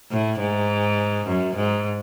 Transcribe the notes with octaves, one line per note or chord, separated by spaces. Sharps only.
A2
G#2
F#2
G#2